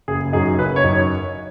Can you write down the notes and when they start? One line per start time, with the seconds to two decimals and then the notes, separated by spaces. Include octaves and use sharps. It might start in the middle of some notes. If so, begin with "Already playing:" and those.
0.08 F#1 G#4
0.33 F#2 F#3 D#4 G#4
0.59 F#1 B4
0.76 C#5
0.84 F#2 F#3 D#4
0.93 C#5